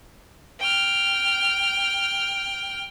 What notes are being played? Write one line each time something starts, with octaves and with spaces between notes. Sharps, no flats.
G5 F6